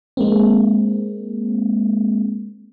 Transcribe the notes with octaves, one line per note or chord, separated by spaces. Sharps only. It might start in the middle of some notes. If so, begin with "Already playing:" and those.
G#3 A#3 C4